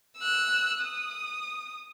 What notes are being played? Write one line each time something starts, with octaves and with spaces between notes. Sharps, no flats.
E6 F#6
D#6